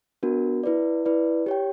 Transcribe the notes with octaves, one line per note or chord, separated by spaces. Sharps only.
B3 D4 F#4 A#4
E4 B4 D5
E4 B4 D5
G4 C#5 G5